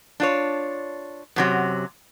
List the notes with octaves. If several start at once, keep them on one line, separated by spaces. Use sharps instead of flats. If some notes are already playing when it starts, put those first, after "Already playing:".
D4 F4 C#5
F#2 C3 F#3